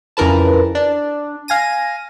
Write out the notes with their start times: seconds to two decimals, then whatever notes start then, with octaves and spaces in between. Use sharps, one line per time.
0.17 F2 C#3 E3 A#4 B4 A5
0.75 D4
1.48 F5 G#5 A#6 D#7